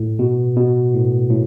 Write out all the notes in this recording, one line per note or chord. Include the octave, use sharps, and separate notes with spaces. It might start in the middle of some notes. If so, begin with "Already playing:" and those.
Already playing: A2
B2
B2
A2
A2